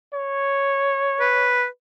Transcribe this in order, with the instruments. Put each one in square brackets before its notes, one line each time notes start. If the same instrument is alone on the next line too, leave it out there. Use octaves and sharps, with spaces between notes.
[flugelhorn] C#5
[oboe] B4